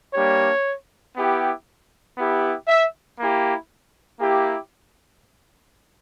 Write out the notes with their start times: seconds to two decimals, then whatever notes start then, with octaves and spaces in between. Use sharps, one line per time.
0.14 G3 A#3 D4 G4 C#5
1.16 B3 E4 G4
2.17 B3 E4 G4
2.68 E5
3.19 A#3 E4 G4
4.20 A#3 E4 G4